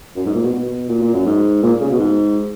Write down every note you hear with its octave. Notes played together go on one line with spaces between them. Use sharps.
F#2
G#2
A#2
B2
B2
A#2
A#2
F#2
G#2
A#2
C#3
B2
G#2